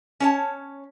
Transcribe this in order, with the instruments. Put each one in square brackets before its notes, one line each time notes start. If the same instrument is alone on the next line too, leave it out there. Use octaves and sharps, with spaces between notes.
[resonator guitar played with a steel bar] C#4 C#5 A5